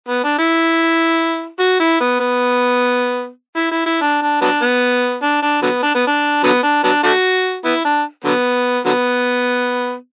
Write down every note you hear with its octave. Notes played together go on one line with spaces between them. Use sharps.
B3
D4
E4
F#4
E4
B3
B3
E4
E4
E4
D4
D4
F#3 B3 D4
B3
D4
D4
D3 F#3 B3
D4
B3
D4
D3 F#3 B3
D4
F#3 B3 D4
A3 D4 F#4
B3 E4
D4
D3 F#3 B3
D3 F#3 B3